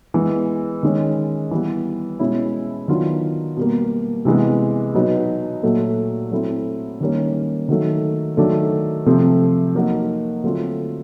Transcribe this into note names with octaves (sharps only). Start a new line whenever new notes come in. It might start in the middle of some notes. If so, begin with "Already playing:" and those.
E3 G#3 B3
D#3 G#3 C#4
E3 G3 B3
B2 G#3 C#4 E4
D#3 F#3 B3 D4 F4
B2 G3 A#3
C3 E3 G#3 B3
B2 F#3 B3 D#4
A#2 F#3 A3
F#3 A3 C4 E4
D#3 G3 A#3 C#4
D#3 F#3 A3
D#3 F#3 A3 D4
C3 F3 A3 C4
F#3 A#3 D#4 F#4
D3 F#3 A3 C4 F4